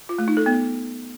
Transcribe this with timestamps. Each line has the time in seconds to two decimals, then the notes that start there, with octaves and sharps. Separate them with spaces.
0.09 F4
0.18 A3
0.28 D#4
0.37 A4
0.46 B3